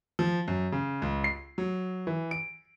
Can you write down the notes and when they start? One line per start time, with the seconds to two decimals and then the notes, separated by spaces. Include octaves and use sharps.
0.19 F3
0.48 F#2
0.72 C#3
1.02 C#2
1.24 C7
1.58 F#3
2.07 E3
2.31 D7